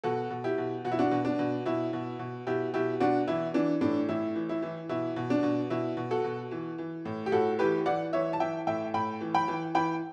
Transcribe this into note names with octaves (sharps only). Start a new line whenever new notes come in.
B2 F#4 A4
B2
E4 G4
B2
B2 F#4
E4
D4 F#4
B2
D4
B2
B2 E4
B2
B2
B2 E4 G4
B2 E4 G4
B2 D4 F#4
E3 E4
E3 D4
A2 D4
A2 E4
E3
E4
E3
B2 E4
B2
D4
B2
B2 E4
B2
F#4 A4
B2
E3
E3
A2
G4
A2 F#4 A4
E3 G4 B4
E3 D5 F#5
E3 C#5 E5
A5
E3 E5 G5
A2 E5 G5
A2 G5 B5
E3
G5 B5
E3
E3 G5 B5